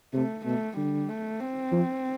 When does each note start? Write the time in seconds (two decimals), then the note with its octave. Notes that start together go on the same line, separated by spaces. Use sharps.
0.13 C3 A3
0.45 B2 A3
0.77 D3 G3
1.08 A3
1.40 C4
1.72 F3